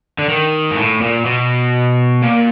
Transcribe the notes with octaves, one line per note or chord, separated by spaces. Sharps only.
D3
D#3
G#2
A2
A#2
B2
A#2